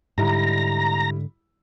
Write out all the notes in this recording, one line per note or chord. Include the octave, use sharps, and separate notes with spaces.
G#2 D3 G3 E4 A#5